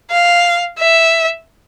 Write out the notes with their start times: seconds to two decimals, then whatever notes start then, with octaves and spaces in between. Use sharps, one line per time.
0.11 F5
0.79 E5